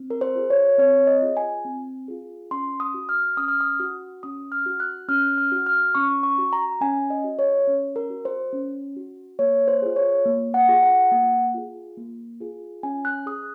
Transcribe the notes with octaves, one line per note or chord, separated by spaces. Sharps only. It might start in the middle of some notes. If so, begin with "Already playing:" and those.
Already playing: C4
A#4
C5
F4 G#4
C#5
C4 C#5
D#5
F4 G#4
G#5
C4
F4 G#4
C#4 C6
D#6
F#4
F6
C#4 D#6
F6
D#6
F#4
C#4 D#6
F6
F#4
F#6
C#4 F6
F6
F#4
F6
C#4 C#6
C#6
F#4
A#5
C#4 G#5
D#5
F#4
C#5
C#4
A#4
F#4
C5
C#4
F#4
A#3 C#5
C5
F4 G#4
C#5
A#3
F#5
F4 G#4
F#5
A#3
F4 G#4
A#3
F4 G#4
C#4 G#5
F#6
G#4 D#6